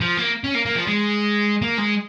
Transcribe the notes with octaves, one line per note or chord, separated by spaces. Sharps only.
F3
A#3
C#4
A#3
A#3
F3
G#3
A#3
G#3